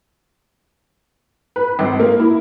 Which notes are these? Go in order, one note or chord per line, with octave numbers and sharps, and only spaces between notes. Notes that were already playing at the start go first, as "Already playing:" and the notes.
B4
G#1
A#3
E4